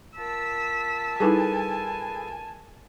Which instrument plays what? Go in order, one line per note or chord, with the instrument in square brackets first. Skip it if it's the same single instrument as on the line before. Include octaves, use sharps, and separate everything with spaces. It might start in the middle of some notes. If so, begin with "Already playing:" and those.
[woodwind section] F4 A#4 A5 [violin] E6 B6
[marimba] G3 D#4 E4 [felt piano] G#4 A4 B4 [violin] G#5